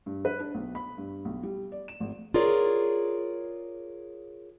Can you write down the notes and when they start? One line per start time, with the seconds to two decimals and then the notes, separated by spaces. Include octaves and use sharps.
0.06 G2
0.25 B4
0.40 D4
0.55 B1
0.75 B5
0.98 G2
1.25 B1
1.43 G3
1.72 D5
1.88 E7
2.00 G#1
2.34 F4 G#4 A#4 C#5 D5